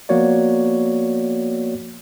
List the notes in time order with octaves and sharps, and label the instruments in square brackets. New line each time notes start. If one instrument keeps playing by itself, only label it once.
[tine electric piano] F3 A#3 B3 F#4 C#5 D5